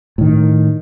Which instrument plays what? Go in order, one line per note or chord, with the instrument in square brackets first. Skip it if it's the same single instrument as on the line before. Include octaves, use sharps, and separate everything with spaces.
[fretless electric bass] A2 D#3